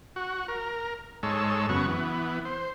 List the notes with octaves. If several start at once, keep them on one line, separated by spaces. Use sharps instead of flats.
F#4
A#4
G#2 G#3 A4 C#5 E6
F#2 C#3 B3 F#4 C#6
E3 B3
C5